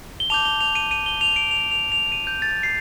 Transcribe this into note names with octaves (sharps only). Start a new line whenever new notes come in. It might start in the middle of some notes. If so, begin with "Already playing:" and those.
G7
A5 D6 G6 F7
G7
F7
D#7
D#7
G7
F7
D7
F7
F7
F7
D#7
G6
A6
C7